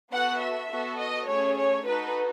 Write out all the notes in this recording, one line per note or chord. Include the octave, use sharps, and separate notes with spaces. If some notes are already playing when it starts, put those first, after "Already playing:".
B3 F#4 A4 F#5
E5
B3 F#4 A4
D#5
A3 C#4 G#4 C#5
C#5
D#4 F#4 A4 B4